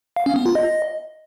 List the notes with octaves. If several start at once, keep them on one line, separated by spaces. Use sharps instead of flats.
F5
C#4
B3
F4
D#5